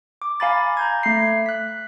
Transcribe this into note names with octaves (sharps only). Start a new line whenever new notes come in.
D6
F5 G#5 A#5 B5 D6 A6
A#5 G6 G#6
A3 C7
F#6 B6